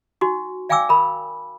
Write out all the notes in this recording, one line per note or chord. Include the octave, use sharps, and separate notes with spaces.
D#4 F#4 C#6
D5 F5 G5 G#5 D6 E6
A#4 B5